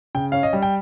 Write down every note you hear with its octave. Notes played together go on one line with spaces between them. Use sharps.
C#3 G5
C#4 F5
D#5
G3
G5